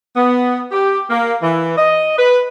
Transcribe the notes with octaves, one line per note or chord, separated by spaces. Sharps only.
B3
G4
A#3
E3
D#5
B4